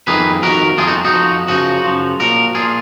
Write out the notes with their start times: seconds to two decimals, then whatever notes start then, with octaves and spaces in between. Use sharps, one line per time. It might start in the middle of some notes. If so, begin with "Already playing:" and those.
0.07 F2 D#3 G#4 B4
0.42 F2 D#3 F#4 A#4
0.78 F2 F3 F4 G#4
0.86 D#4 F#4
1.05 D#4 F#4
1.14 F2 F3
1.48 F#2 C#3 F3 D#4 F#4
1.84 F#2 C#3 F3
2.20 A#2 F3 F#4 A#4
2.55 A#2 F3 F4 G#4